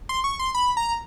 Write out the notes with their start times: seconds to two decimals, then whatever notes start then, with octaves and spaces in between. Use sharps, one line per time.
0.09 C6
0.24 C#6
0.39 C6
0.55 B5
0.77 A#5